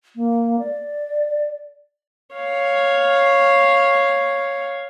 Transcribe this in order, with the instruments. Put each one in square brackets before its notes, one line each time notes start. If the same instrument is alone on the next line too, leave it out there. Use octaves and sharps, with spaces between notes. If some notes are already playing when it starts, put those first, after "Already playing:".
[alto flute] A#3
D5
[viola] C#5 F5